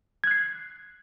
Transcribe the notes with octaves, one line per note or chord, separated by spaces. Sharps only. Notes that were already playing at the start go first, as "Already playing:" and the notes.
F#6 G#6 C7